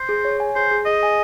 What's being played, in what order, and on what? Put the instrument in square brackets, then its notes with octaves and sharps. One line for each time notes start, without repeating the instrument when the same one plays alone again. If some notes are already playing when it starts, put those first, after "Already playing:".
Already playing: [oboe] C5
[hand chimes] G#4
C#5
G#5
[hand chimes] G#4 [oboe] C5
[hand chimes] G#4
[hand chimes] G#4 [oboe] D#5
[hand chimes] G#5